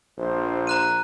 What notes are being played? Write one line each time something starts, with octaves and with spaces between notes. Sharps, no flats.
A#1 C5
A#5 F#6 D#7